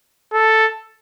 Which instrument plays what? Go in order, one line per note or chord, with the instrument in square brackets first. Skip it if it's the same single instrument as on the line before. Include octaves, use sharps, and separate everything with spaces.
[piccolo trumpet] A4